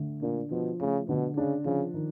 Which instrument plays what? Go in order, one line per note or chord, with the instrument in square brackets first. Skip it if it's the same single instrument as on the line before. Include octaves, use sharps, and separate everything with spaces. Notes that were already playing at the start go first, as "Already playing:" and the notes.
Already playing: [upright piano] D3 A3
[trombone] A#2 [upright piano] D4
[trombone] B2 [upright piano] F3
[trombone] C#3 [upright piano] A3
[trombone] B2 [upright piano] D3
[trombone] C#3 [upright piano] D4
[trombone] C#3 [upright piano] F3
[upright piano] D#3